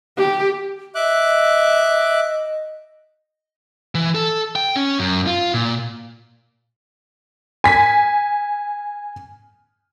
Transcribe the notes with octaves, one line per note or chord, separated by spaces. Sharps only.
G4
D#5 E5 D6 F#6
E3
A4
G5
C#4
F#2
F4
A#2
G#5 B6